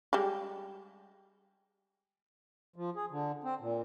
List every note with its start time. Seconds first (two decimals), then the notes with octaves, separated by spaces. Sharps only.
0.13 G3 G#3 G4
2.76 F3
2.96 G#4
3.11 D3
3.44 C4
3.61 A#2